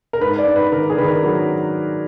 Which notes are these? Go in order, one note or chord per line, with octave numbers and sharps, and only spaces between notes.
A#4
G#2 B4
D5
G#2
B4
D#3 A#4
G#4
D#3 B4
A#4
F#3 B4